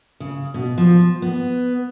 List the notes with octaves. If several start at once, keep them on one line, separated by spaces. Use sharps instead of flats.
C#3
B2
F3
B3